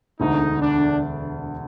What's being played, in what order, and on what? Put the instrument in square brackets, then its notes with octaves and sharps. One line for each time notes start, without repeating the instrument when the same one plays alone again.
[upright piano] E1 D2 D3 [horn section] D#4
[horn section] D4